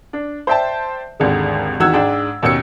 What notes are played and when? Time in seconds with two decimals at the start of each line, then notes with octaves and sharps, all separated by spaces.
0.13 D4
0.47 C5 D5 E5 G5 A5
1.20 G#1 D#2 D3 G#3
1.80 E2 D#3 F#4 E6 G#6 E7
1.93 G#2 G#3 D4 G5
2.43 D#2 B2 C#4 E6 C#7